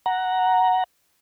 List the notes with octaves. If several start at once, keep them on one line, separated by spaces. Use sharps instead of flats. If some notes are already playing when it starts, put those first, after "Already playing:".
F#5 A#5